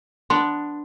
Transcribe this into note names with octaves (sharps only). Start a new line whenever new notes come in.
B3 D4 C6